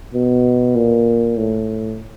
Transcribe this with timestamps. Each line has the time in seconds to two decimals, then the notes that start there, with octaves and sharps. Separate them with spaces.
0.14 B2
0.75 A#2
1.37 A2